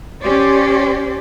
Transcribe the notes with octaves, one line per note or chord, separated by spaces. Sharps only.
C#4 G4 C5 D5